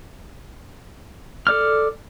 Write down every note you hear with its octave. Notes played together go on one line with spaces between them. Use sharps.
A4 D5 F6